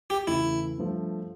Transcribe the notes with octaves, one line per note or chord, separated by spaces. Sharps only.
G4
E2 C#3 E3 A3 E4
G2 F3 A3